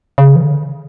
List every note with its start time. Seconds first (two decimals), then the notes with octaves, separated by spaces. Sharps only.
0.18 C#3
0.36 E3
0.42 D3